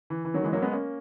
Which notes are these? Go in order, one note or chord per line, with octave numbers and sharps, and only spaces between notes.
E3
E3
D#3 F#3
E3 G#3
F#3 A#3
G#3 B3
A#3 C#4